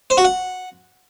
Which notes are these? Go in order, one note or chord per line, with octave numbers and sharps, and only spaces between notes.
C5
F#4
F#5